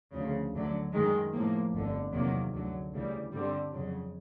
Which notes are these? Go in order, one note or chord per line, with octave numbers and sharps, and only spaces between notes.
D2 C#3 F3
D2 D3 F#3
F#2 D#3 G#3
A2 F3 A#3
G1 F2 D3
E2 C3 D#3 F#3 A#3
D2 D3 F#3
D2 C#3 E3 G3
G2 D3 G3 C4
F2 C#3 F#3